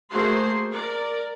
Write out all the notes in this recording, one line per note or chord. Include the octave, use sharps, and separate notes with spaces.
A3 A#3 F#4 G#4 C5 C6
A#4 D5